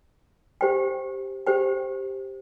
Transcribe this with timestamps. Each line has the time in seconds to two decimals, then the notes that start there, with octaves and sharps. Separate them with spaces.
0.61 G4 C5 G5
1.47 G4 C5 G5